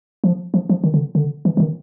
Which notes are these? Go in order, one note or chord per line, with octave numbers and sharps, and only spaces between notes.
F3
F3
F3
D#3
D3
D3
E3
E3
D#3